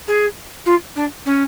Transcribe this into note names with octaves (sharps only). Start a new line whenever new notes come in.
G#4
F4
D4
C#4